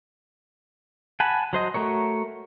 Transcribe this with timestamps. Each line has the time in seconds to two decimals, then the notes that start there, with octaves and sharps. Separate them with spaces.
1.20 F#5 G#5 A5 B5
1.53 F#3 C5 D#5
1.74 A3 F#4 A#4 C#5